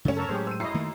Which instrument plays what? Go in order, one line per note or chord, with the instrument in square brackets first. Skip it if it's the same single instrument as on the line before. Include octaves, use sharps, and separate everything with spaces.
[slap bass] F#2 C#3 [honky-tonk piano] A3 C#4
[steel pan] A4 A#4 C#5
[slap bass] A2 F#3 G#3 [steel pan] G4 G#4 C5
[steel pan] C5 [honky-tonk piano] E6 D#7
[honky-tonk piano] F#2 C7 [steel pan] E4 C#5 D#5
[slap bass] D#3 A3 A#3